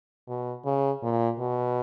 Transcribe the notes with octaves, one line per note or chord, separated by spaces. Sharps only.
B2
C#3
A#2
B2